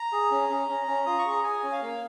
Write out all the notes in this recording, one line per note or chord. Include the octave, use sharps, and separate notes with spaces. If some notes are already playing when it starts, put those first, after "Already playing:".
Already playing: A#5
G#4
C#4
C#4
C#4
C#4
F4 D#6
C#6
G#4
A#5
G#4 G#5
C#4
F5
A#3